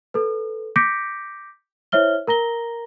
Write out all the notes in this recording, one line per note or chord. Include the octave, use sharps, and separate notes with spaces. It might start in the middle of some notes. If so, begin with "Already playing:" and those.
A4 B4
D6 G6 A#6 B6 C#7 D7
E4 C5 C#5 E5 F6 G7
A#4 A#5 A#6 G7